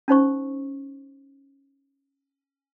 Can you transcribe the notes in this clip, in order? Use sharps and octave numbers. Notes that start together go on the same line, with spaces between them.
C#4 D#4 C5 C#6